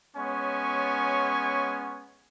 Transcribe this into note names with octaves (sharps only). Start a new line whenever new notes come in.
G#3 B3 C#4 C#5 G#5 C#6